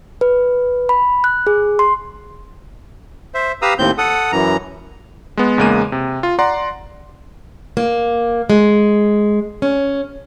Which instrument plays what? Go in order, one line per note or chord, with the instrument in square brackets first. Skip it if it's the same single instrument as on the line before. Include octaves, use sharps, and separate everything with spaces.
[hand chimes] B4
B5
F#6
G#4
C6
[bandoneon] C5 E5
G4 B4 F5 A#5 D#6 E6
D#2 A2 C4 G6
A4 F#5 D#6
F#2 E3 A#5
[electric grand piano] G#3 B3
E2 C#3 G#3 A#3 D#7
C3
F4
D5 F#5 A#5 C6
[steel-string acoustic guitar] A#3
G#3
C#4